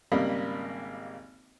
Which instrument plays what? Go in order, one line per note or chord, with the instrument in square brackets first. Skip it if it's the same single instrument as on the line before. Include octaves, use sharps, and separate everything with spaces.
[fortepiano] G#1 C#3 G3 A#3 D#5 B5